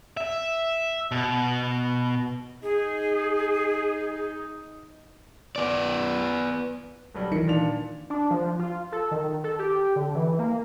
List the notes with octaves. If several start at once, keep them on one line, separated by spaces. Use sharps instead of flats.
E5
B2
D#4 G#4
B3 D5
B1 F#3 G3
D#3 E3 C#7
A#2 D4 F7
D4
F3
F4
A4
D#3
A4
G4
D3
E3
A#3